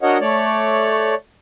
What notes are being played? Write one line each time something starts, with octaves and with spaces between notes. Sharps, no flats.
D4 F#4 A#4 C#5 D#5 F#5
A3 C#5 D5